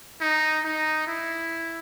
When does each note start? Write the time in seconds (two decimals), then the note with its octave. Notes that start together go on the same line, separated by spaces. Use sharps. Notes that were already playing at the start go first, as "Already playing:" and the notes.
0.20 D#4
0.64 D#4
1.07 E4